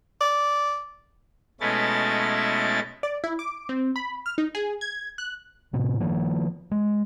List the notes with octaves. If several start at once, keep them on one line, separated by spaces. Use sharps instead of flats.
D5
B2 G#3 A3 C#4 E4 A6
D5
E4
D6
C4
B5
F6
D#4
G#4
G#6
F#6
A2 C3
D#3 F3 A#3
G#3